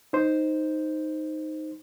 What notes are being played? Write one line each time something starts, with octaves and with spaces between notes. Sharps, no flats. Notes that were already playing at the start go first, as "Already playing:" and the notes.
D#4 C5